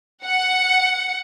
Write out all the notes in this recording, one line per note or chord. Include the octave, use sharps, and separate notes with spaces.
F#5 C#7